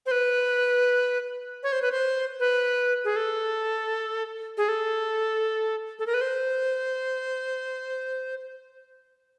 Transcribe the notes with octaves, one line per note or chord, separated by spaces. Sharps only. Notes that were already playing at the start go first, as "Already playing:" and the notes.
C5
B4
C#5
C5
B4
C5
B4
G#4
A4
G#4
A4
A4
A#4
B4
C5